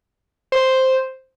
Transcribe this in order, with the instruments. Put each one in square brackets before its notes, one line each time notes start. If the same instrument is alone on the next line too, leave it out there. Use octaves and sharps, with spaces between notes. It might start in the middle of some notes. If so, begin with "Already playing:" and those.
[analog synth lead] C5